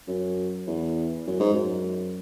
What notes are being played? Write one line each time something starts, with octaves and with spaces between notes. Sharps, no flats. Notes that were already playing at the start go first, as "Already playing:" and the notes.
F#2
E2
F#2
G#2
F#2